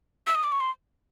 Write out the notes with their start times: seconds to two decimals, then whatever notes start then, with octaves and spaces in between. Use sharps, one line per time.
0.27 E6
0.35 D#6
0.43 D6
0.52 C#6
0.60 C6